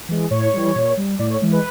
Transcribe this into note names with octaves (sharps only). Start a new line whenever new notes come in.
E3 G#3
A2 C#5
E3 G3
A#2
G3
A2 D5
C#5
E3 G#3
B4